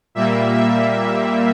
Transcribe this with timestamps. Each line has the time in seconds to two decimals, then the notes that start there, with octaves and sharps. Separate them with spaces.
0.15 A#2 G3 A#3 E5
0.56 E5